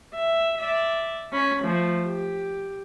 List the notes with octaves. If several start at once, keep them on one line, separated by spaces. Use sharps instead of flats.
E5
D5 E5
C#4 B5
F3 A3
G4